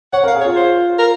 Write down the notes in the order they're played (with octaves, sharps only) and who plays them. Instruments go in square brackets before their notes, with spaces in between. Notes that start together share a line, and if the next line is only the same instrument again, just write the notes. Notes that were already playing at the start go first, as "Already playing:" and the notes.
[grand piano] C#5 [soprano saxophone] F#5
[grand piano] A#4
[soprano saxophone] F5
[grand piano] G#4
[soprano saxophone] C#5
[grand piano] F4
[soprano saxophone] C5
A#4